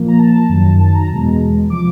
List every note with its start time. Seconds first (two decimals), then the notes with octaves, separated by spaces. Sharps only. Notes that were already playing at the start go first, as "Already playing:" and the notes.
Already playing: A#2 F3 A#3
0.08 A#5
0.19 A5
0.49 F#2 D#3 F#3
0.80 A5
0.94 A#5
1.09 E2 B2 G#3
1.70 C3 F3 D6